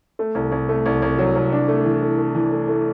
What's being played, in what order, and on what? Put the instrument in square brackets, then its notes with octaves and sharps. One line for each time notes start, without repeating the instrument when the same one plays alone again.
[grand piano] A3
C2
C2
A3
C2
C2
F#3
C2
D4
A3
E3
A3
A3
E3
A3
A3